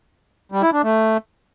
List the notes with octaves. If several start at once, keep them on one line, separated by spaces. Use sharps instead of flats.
G3
E4
D4
A3